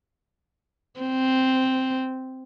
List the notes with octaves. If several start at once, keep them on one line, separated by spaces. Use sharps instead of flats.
C4